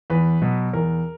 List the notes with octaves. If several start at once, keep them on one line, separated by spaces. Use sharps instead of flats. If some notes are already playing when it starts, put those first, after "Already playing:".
E2 B4
B2 F#3
E2 A#4